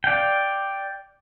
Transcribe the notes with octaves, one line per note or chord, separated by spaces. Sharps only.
D5 F5 G5